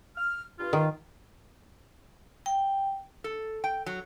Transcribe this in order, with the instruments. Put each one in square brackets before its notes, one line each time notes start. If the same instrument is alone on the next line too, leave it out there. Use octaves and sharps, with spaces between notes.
[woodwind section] F6
G2 F4
[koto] D#3
[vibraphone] G5
[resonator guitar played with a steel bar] A4
G5
F#3